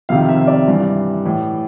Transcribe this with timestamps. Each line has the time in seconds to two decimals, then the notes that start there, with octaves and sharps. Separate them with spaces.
0.09 F2 C3 D#3 F5
0.29 E5
0.47 D5
0.68 G2 E3
1.26 A2 E3